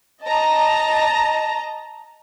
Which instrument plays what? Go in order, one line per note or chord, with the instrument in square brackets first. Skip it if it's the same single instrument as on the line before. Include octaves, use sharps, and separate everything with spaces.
[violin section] D#5 A5 A#5